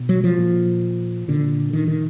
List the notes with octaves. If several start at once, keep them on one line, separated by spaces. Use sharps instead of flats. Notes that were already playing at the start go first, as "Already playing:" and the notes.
Already playing: B2
F#3
F3
A#2
A#2 D3
D#3
D#3